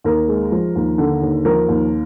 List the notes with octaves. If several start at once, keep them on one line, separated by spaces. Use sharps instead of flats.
D#2 A#4
G#3
F3
D#2
D3
D#2
F3 A#4
D#2